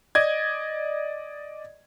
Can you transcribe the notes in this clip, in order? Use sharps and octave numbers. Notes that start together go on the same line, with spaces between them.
D5 D#5 G#6